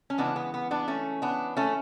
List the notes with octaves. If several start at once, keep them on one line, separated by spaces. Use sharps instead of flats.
C#4
C#3 E3 G#3 B3 D4
B3
B3
B3 D4
A3 C#4
B3 D4
A3 C#4